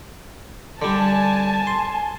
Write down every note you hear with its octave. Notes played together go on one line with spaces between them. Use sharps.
D3 G3 G#5 A5
C6